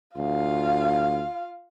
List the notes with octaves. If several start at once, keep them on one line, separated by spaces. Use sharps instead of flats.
D2 F4 F5